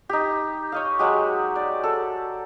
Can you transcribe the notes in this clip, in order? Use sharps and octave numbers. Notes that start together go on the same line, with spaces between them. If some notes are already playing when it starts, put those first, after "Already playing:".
D#4 G4
C#5 D#5 F5
F#3 G#3 G4
D5
A4